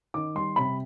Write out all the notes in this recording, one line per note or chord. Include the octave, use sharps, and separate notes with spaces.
D#3 D6
G3 C6
C3 B5